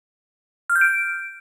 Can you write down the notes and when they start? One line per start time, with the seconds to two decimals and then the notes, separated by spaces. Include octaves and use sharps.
0.70 F6
0.75 G6
0.81 D7